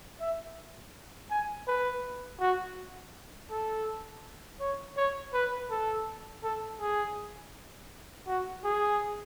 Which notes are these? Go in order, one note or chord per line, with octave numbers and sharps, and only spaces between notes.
E5
G#5
B4
F#4
A4
C#5
C#5
B4
A4
A4
G#4
F#4
G#4